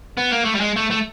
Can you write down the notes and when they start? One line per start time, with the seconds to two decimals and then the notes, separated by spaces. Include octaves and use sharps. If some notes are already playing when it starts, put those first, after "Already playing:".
0.17 B3
0.31 A#3
0.45 A3
0.55 G3
0.60 G#3
0.76 A3
0.91 A3